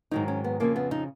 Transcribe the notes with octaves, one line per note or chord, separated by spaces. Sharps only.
G#2 D#3 F#3 D#4
C#4
B3
F2 C#3 F3 A#3
B3
D#4